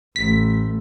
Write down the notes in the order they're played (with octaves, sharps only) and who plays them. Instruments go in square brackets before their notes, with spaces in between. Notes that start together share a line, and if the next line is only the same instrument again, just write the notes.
[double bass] A1 A3 [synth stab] B6